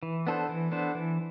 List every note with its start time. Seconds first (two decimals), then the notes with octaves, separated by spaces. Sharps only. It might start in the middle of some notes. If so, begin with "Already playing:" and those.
0.03 E3
0.27 B3 D4 A4 C5
0.49 E3
0.72 B3 D4 A4 C5
0.95 E3